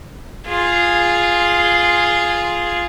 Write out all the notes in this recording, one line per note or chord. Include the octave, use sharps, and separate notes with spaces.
F4 G#4